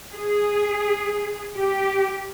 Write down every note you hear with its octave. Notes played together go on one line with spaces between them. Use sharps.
G#4
G4